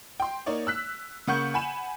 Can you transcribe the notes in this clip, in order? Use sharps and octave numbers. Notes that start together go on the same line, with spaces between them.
G5 C6
A#3 D#4 C#5 D5
E6 F#6 B6
C#3 A#3 F#5 C#6 G6 C#7
F#5 G#5 B5 E7